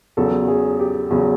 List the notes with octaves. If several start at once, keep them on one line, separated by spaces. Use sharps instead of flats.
E2 C#3 F#3 A4
G#4
G4
E2 C#3 F#3